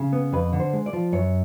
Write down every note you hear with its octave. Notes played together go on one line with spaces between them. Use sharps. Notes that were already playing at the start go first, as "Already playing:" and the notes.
Already playing: C#3
B3
F2 B4
D3
C5
G#3
D5
F3
F#2 C#5